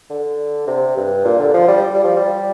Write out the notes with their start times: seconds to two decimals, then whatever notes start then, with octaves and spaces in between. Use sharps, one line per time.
0.10 D3
0.67 C3
0.96 G2
1.25 A#2
1.39 D3
1.54 F3
1.68 G3
1.94 G3
2.04 F3
2.16 G3